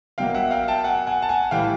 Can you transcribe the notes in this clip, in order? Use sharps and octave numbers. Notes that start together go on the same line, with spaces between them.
B2 F#3 A#3 F5 G5
E5 F#5
F5 G5
G5 A5
F#5 G#5
F#5 G#5
A5
F#5 G#5
A2 E3 G3 F5 G5